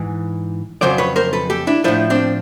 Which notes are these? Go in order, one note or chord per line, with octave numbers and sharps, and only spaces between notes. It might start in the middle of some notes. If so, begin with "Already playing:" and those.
Already playing: G#2 E3
F2 C#3 F#3 C5 D5
B4 C#5
A#4 C5
A4 B4
G4 A4
D4 E4
A2 F3 D4 E4
C4 D4